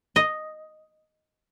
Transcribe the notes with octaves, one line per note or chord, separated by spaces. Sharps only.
D#5